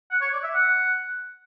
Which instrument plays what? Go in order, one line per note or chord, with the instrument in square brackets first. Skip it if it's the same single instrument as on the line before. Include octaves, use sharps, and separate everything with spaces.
[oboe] F#5
C#5
D5
E5
F#5